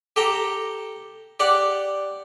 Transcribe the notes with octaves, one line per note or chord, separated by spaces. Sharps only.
G4 A4 G5 A#5
G4 D5 F#5